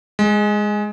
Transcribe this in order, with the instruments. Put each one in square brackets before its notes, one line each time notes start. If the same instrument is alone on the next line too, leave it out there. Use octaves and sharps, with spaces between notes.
[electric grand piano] G#3